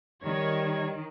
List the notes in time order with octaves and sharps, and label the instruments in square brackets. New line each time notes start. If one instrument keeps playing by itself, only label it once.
[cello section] D#3 [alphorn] G3 [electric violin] C#5 G#6